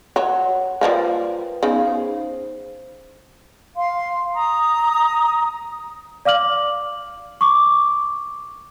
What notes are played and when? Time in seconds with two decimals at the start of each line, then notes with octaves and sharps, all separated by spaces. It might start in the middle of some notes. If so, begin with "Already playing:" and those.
0.16 F#3 C#5 F#5
0.81 F3 G3 A#3 B4
1.63 C#3 B3 D#4 G#4
1.87 C5
3.77 F5 C6
4.35 A#5 D#6
6.25 D5 F5 D6 F6 F#7
7.41 C#6 D6